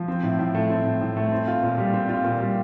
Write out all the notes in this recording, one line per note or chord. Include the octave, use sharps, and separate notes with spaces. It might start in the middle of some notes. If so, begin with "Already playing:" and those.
Already playing: F3
C4
A2
A2
A3
C4
A2
A2
A3
C4
F4
A#2
G3
C4
F4
A#2
G3